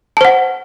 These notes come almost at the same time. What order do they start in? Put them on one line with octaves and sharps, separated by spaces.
A5 C5 F#5